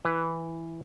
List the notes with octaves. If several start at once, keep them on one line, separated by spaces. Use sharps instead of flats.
E3 B4